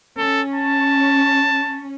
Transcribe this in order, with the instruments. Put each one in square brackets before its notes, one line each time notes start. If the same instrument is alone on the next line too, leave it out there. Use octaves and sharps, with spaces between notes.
[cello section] C#4 [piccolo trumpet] A4
[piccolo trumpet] A5